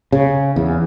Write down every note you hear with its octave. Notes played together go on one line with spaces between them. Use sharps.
C#3
E2